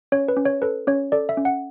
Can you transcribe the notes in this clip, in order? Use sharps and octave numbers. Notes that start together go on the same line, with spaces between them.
C#4 C#5
B4
C#4
C#5
A4 B4
C#4 C#5
A4 D5
E5
C#4
F#5